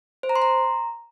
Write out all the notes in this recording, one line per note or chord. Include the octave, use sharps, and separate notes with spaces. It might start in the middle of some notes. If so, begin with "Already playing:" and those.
C5
A#5
C6
A#5